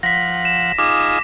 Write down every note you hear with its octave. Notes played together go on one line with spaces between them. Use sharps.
F3 F#5 A#6 B6
E7
D#4 F4 G#4 D6